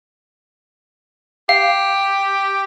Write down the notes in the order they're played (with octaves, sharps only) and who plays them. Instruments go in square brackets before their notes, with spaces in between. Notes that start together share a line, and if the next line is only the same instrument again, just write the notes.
[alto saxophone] G4 [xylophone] F5